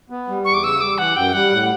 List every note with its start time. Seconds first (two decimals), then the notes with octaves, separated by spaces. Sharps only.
0.10 B3
0.28 G3
0.45 E2 C#6
0.54 D6
0.63 C#3 E6
0.81 G3 D6
0.98 E3 F#5
1.15 F#2 G5
1.33 G3 F#5
1.51 A2